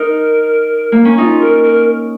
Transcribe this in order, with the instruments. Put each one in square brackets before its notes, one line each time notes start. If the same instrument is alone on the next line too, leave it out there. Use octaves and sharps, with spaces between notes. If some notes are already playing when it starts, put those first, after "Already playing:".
Already playing: [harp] D#4 [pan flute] A#4
[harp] A#3
C#4
[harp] D#4 [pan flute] F4
[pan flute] A#4
A#4